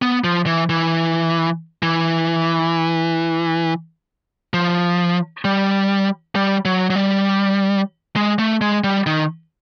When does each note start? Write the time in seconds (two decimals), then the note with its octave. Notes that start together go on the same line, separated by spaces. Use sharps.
0.02 B3
0.24 F3
0.46 E3
0.69 E3
1.83 E3
4.54 F3
5.45 G3
6.35 G3
6.65 F#3
6.90 F#3
6.96 G3
8.16 G#3
8.39 A3
8.61 G#3
8.84 G3
9.06 D#3